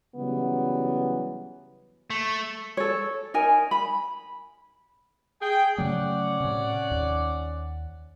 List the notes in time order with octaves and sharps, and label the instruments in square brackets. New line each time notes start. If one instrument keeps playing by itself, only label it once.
[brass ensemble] C#3 E3 F#3 G3 B3
[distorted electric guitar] A3
[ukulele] A4 C#5
D#4 A#4 G#5
B5
[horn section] G#4 G5
[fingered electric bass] C#3 F#3 A3 [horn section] C#4 D5 F#5
[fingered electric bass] A2 C3
D#2